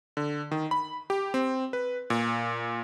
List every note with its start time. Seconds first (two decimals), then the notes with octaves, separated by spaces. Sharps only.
0.17 D3
0.51 D#3
0.71 B5
1.10 G4
1.34 C4
1.73 B4
2.10 A#2